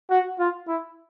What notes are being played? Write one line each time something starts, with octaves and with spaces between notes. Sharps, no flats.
F#4
F4
E4